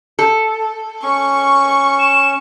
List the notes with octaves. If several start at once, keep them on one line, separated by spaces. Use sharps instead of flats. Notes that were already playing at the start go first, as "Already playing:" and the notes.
A4
C#4 C#6
E7